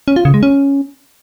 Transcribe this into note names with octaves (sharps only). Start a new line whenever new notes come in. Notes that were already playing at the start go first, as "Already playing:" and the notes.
C#4
F4
C#3
G#3
C#4